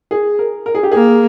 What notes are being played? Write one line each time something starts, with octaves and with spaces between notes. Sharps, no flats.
G#4
A#4
A#4
G#4
G4
A#3 G#4